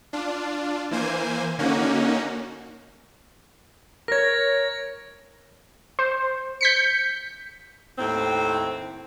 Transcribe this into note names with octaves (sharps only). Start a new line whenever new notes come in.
D4 F4
E3 A#3 C5 G#5
D3 A#3 C#4 D#4 F#4
A#4 C#5 G#6 A#6
C5
G6 B6 C#7
D#2 A2 C4